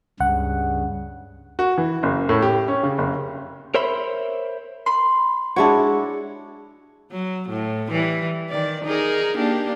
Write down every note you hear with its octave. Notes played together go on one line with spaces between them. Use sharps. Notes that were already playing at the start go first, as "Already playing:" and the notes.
C#2 G2 C#3 F#5
F#4
E3
F#1
A2
G4
C#4
C#3
F#1
A#4 C5 C#5 E5 B5 C6
B5 C6
G#3 D4 E4 F#4 C#5
F#3
A2
E3 G3
D#3 D5
D#4 G#4 A#4
A#3 D4 G4